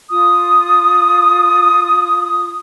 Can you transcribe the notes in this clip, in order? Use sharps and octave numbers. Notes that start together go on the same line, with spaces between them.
F4 D#6